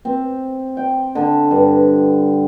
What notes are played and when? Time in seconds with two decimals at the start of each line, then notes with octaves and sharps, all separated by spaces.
0.05 C4
0.77 G5
1.15 D3
1.51 G2